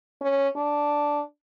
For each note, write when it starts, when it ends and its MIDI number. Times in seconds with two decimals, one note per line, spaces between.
0.21 0.48 61
0.56 1.22 62